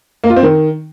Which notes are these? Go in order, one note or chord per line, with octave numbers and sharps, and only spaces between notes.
A#3
F4
C4
D#3